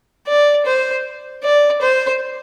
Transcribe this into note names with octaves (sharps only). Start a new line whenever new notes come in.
D5
C5
D5
C5